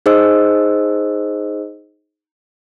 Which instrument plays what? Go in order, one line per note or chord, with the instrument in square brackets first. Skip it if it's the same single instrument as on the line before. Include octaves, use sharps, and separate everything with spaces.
[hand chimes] D#4 G#4 C5 D#5 E6